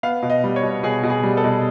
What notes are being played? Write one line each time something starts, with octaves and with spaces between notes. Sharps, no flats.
B3 F5
B2
D#5
G3
C#5
B2
B2 G#4
B2
G#4
G3
A4
B2